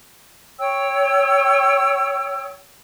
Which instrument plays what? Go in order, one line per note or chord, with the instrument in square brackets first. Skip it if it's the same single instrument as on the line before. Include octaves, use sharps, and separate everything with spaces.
[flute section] C#5 G5 E6